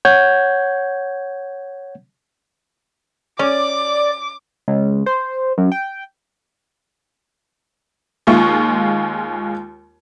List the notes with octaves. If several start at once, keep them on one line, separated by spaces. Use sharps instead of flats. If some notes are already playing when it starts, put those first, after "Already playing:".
C#5 F#5 G6 G#6
C#4 D5 D6
C#2
C5
F#2
G5
D#2 G#3 F4 C#6